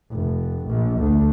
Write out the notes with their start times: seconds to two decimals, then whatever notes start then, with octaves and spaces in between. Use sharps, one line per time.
0.10 F1
0.67 A#1
0.98 D2